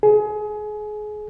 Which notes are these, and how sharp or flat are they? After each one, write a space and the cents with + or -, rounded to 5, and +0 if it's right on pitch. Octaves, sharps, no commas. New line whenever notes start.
G#4 +30